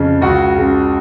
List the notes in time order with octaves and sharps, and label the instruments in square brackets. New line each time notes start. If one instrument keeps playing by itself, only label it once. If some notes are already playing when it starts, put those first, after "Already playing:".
Already playing: [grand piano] F2 C#3
C#2 F#4
C#3